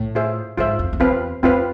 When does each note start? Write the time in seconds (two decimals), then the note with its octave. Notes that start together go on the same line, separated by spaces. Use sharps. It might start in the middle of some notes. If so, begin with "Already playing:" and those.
Already playing: A2
0.15 F4 G#4 C5 E5
0.58 G#2 F4 G#4 C5 E5
0.79 F2
0.93 F2
1.00 E2 C4 F4 B4 F5
1.43 F2 C4 F4 B4 F5